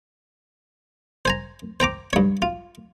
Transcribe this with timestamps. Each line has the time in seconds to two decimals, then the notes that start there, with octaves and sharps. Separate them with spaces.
1.25 C5 G#5 A#5
1.80 C5 G5 A#5 D6
2.13 G2 C#5
2.42 F4